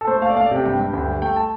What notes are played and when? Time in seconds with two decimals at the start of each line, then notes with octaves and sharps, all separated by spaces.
0.01 A4
0.07 A3 C5
0.22 A3 F5
0.30 D5
0.36 A3 F5
0.46 D5
0.51 C3 G5
0.65 G2 G5
0.80 G2
0.93 D2
1.09 G3
1.22 A3 G5
1.36 A5